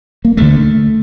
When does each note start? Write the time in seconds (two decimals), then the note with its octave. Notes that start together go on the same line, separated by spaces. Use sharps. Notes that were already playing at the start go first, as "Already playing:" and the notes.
0.25 A#3
0.37 D2 D3 A3